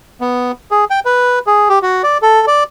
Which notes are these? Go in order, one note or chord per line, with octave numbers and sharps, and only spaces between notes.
B3
G#4
G5
B4
G#4
G4
F#4
D5
A4
D5